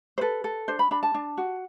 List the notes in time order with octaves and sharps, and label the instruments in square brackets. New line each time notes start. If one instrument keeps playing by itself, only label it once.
[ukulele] C5
A4 B4
A4
D4 C5
B5
D4 B5
A5
D4
F#4